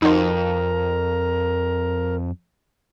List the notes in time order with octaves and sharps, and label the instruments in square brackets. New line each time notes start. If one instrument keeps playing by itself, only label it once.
[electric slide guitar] F2 [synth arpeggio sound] D#4 F#4 C5 [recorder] A#4